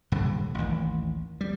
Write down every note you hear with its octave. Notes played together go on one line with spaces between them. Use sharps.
D#1 G2 D3
A1 D#2
G3